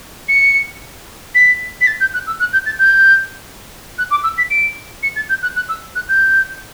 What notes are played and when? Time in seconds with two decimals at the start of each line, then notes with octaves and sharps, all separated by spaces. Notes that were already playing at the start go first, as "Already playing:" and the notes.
0.28 C#7
1.35 B6
1.81 B6
1.87 A6
2.00 G6
2.13 F#6
2.27 E6
2.40 F#6
2.53 G6
2.66 A6
2.78 G6
3.98 F#6
4.11 D6
4.23 E6
4.37 B6
4.50 D7
5.03 C#7
5.16 A6
5.29 G6
5.42 F#6
5.56 F#6
5.69 E6
5.95 F#6
6.08 G6